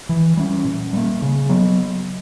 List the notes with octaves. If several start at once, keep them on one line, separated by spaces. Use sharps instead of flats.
E3
G3 A#3 C#4
A#2
G3 A#3
C#3
F#3 B3